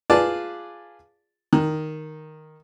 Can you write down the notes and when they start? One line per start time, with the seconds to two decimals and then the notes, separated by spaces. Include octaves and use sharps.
0.10 F4 G#4 B4 D5 A5
1.53 D#3